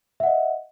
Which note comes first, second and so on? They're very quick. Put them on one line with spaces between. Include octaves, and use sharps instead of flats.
E5 F#5 D#5